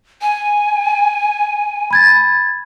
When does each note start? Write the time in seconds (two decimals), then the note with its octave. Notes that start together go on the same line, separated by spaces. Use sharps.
0.22 G#5
1.91 B5 G#6 A6